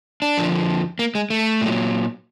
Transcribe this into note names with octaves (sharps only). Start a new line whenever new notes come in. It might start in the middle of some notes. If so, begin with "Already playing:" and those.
D4
F2 D3 F3
A#3
G#3
A3
A#2 F#3